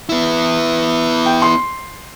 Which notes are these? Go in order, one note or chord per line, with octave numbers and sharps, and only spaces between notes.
B3 E4
G5
C6